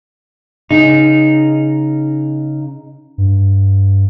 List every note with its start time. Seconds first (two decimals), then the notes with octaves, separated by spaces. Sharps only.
0.71 C#3 D#4
3.18 G2